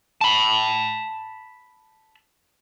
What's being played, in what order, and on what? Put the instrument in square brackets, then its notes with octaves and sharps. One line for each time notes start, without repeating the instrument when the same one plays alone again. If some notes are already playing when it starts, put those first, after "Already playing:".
[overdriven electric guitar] A5 B5